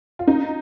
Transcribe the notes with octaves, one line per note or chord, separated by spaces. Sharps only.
F4
D#4